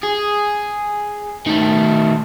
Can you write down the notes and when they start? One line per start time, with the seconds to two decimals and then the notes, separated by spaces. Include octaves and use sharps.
0.03 G#4
1.47 D#3 A3